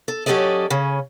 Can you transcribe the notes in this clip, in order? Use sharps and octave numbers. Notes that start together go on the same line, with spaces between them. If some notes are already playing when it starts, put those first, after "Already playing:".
A4
F#3 C#4 G4 A4 D5 D#5
C#3 C#4